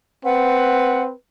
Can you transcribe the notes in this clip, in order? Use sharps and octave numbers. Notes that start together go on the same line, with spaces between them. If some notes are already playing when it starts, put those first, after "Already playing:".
C4 B4 F#5